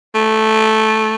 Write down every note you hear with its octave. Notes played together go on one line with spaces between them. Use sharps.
A3